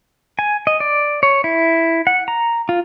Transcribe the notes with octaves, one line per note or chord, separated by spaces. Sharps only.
G#5
D#5
D5
C#5
E4
F#5
A#5
F4